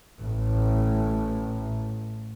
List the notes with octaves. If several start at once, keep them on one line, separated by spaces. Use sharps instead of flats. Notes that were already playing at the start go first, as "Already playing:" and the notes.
A1 A2